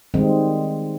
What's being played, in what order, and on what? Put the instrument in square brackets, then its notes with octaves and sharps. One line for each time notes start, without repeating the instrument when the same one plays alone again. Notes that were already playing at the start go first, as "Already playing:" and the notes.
[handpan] D#3 G3 G#3 C4